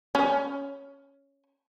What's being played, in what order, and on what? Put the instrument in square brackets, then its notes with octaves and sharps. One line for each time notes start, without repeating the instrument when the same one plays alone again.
[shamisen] C#4